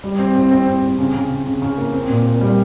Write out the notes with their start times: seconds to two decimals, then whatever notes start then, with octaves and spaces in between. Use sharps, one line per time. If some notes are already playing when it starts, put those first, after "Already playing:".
0.04 G3
0.19 C4
0.35 C4
0.51 C4
0.67 C4
0.83 C4
0.98 C#3
1.14 C#3
1.30 C#3
1.46 C#3
1.62 C#3
1.78 A#3
1.93 C4
2.09 A#2
2.26 A#2
2.41 G3